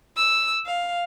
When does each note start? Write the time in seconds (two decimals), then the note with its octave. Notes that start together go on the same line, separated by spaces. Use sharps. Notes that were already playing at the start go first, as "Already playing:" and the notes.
0.17 E6
0.65 F5